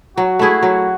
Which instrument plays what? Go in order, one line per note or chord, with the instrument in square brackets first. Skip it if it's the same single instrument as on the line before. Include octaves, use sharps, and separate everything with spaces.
[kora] F#3 [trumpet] F#4
[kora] A3 E4 G#4
F#3